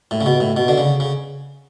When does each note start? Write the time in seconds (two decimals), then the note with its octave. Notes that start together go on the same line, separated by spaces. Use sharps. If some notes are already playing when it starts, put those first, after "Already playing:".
0.11 A2
0.21 C#3
0.26 B2
0.40 A2
0.57 B2
0.68 D3
0.78 C#3
1.00 C#3